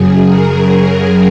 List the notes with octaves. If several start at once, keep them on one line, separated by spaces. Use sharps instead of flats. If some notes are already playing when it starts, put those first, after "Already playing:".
Already playing: F#2 C#3 F#3 G#4
A#4